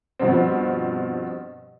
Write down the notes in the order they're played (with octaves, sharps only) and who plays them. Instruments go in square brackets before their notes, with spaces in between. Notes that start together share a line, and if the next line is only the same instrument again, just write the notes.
[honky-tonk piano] G2 B2 F3 C4